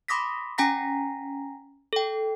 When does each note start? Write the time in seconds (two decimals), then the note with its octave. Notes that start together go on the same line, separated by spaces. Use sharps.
0.08 B5 C6 D6 D#6 A#6 B6
0.58 C#4 G5 G#5 A#5 A#6 B6
1.93 A4 G5